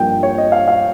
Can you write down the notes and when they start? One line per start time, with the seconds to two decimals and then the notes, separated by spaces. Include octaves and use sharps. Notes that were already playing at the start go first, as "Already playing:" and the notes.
Already playing: G2 F3 A#3 G5
0.23 C#5
0.38 D#5
0.52 F5
0.68 F5